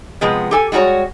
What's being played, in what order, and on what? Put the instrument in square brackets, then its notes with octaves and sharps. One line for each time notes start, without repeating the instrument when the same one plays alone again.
[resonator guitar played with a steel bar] C3 F3 G#3 B3
G4 A4 G#5
G3 G#3 F#4 A#4 C#5